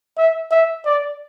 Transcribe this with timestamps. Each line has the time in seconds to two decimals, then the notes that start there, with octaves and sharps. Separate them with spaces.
0.18 E5
0.51 E5
0.86 D5